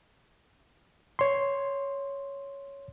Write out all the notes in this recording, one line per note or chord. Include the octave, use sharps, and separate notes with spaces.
C#5 C6